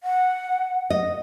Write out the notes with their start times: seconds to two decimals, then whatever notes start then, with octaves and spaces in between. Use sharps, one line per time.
0.03 F#5
0.90 D#5